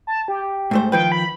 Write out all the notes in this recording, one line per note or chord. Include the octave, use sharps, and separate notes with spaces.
A5
G4
G#2 A3 C5
D#3 F3 B4 G5
B5